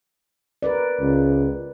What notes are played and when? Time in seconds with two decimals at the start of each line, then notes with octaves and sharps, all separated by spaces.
0.63 A#4 B4 D5
1.00 C#2